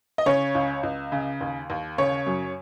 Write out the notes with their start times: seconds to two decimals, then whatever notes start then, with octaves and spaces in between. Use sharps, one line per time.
0.18 D#5
0.26 C#3 C#5
0.55 C#2
0.83 C#2
1.12 C#3
1.41 D#2
1.70 D#2
1.98 C#3 C#5
2.27 F#2